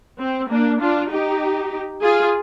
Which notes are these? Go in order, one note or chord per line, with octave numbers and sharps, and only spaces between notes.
C4
A#3 D4
D4 F4
D#4 G4
F4 G#4